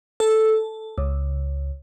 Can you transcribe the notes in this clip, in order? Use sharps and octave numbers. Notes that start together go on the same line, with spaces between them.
A4
C#2